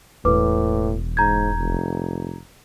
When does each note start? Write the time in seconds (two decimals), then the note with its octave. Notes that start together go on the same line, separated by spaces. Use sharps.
0.25 E1 A2 B4 D6
1.17 G#2 A#5 G6 G#6
1.56 F1